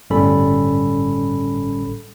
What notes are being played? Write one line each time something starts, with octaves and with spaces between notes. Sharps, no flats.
G1 A2 G3 C#4 A4 B5